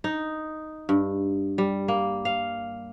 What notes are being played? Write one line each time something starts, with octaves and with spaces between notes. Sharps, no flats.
D#4
G2
G3
A#3
F5